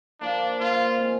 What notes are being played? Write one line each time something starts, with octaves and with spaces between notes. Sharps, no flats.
A#2 F3 A#3 D4
A#2 F3 A#3 F4
D#3 G#3 C4